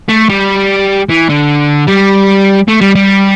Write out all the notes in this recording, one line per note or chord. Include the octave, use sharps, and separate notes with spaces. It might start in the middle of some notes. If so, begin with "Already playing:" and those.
A3
G3
E3
D3
G3
A3
G3
G3